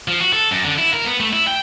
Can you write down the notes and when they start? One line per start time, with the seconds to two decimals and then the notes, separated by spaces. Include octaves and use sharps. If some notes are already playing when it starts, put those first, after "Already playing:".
0.08 F3
0.20 F#4
0.33 A4
0.51 F#2
0.65 D3
0.78 E4
0.93 A#4
1.05 B3
1.20 A3
1.33 E4
1.47 G5